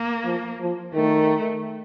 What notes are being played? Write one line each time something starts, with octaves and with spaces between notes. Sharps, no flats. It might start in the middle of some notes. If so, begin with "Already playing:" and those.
Already playing: A#3
F3
F3
D#3 A3